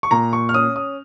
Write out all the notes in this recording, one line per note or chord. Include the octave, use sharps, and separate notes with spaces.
C#6
A#2 A#5
C#6
F6
C#4 D#6
D#6